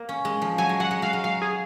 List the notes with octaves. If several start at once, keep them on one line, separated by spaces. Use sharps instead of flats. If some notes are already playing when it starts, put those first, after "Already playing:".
Already playing: A#3
C#4
G#3
F3
F#3 G#5
G#3
F#3 F#5
G#3
F#3 F5
G#3
F#3 F5
G#4